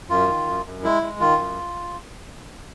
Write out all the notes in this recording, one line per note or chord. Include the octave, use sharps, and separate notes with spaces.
F#2 F4
D#3
F#2
F#2
G#3 E4
G#3
D#3 F4
F#2